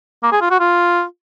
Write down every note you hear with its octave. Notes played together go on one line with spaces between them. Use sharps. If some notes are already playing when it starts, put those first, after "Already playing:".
A#3
G#4
F4
F#4
F4